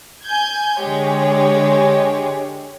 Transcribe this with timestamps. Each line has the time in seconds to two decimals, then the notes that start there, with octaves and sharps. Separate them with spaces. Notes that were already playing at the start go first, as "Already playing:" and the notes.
0.25 G#5 G6 G#6
0.81 D3 G#3 G4 C#5